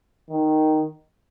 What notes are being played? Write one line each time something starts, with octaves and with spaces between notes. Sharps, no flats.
D#3